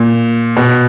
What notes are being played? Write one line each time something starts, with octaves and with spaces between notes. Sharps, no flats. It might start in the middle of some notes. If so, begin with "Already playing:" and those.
Already playing: A#2
B2